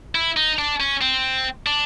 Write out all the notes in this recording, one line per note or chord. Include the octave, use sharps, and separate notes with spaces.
E4
D#4
D4
C#4
C4
D4